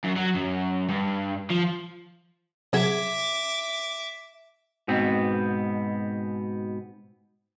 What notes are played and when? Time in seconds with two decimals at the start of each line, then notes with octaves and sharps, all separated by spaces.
0.05 F#2
0.17 F#3
0.35 F#2
0.89 G2
1.50 F3
2.73 C3 F#3 G#4 E5 D6
4.88 G#2 B2 B3 C4